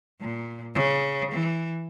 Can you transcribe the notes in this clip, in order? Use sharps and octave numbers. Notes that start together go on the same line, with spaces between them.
A#2
C#3
E3